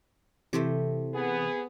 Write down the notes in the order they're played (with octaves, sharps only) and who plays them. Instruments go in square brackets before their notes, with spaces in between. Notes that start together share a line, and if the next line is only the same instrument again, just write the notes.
[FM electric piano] C3 E3 [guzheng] A3 C4 G4
[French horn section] B3 G#4